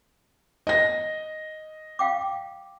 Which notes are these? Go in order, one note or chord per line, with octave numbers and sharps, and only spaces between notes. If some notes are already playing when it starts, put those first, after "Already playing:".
D#5 A#6
F5 G5 D6